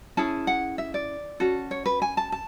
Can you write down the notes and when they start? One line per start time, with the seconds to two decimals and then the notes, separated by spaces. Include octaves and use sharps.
0.17 C#4 E4 G#4 A5
0.47 F#5
0.78 E5
0.94 D5
1.40 C#4 F#4 A4
1.71 C#5
1.86 B4
2.02 G#5
2.17 A5
2.32 A5